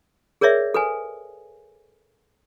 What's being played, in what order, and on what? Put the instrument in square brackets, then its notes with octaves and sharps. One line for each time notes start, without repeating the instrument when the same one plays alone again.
[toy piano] G#4 A#4 C#5 D5 E5
A4 B4 G#5